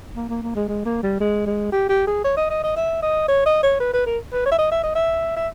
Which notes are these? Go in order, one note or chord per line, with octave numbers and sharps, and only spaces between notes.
A#3
A#3
A#3
G#3
G#3
A#3
G3
G#3
G#3
G4
G4
G#4
C#5
D#5
D#5
D#5
E5
D#5
C#5
D#5
C#5
B4
B4
A#4
B4
C#5
E5
D#5
E5
D#5
E5
E5